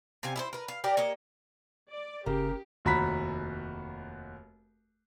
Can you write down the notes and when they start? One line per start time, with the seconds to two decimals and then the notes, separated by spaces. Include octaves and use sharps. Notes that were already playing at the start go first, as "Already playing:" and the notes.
0.23 C3 C4 F5 G#5
0.36 E4 G#4 C5
0.53 A#4 B4
0.68 F5
0.84 G4 A#4 D5
0.97 A#3 C#5 D#5
1.90 D5
2.26 F#1 C#3 G4 A#4
2.85 F1 D#2 F#4 A#5 B5 B6